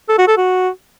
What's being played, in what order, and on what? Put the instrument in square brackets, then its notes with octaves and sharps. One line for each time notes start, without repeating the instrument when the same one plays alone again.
[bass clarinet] A4
F#4
A4
F#4